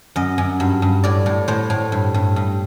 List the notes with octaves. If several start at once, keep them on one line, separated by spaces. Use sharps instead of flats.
F#2 D#5
F#2
G2
G2
A2 D5
A2
A2 C5
A2
G2
G2
G2